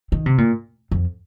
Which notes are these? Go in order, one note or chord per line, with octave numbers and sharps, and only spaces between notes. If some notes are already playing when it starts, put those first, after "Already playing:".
D#3
C3
A#2
F2